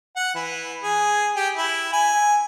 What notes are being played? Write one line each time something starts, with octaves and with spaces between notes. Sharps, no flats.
F#5
E3
G#4
G4
E4
G#5